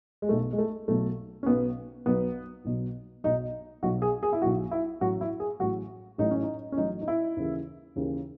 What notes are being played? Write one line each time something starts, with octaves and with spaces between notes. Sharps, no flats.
G#3
B1 B2 F#3 A3
G#3
A3
B1 B2 F#3 A3
C#4
B1 B2 F#3 B3
B1 B2 F#3 B3
B1 B2 F#3
B1 B2 F#3 D#4
B1 B2 F#3 F#4
G#4
G#4
E4
B1 B2 F#3 F#4
E4
A1 A2 F#3 F#4
E4
G#4
A1 A2 F#3 F#4
A1 A2 F#3 D#4
C#4
D#4
C#4
A1 A2 F#3 D#4
D#4
E4
D#2 C#3 E3
D#2 C#3 E3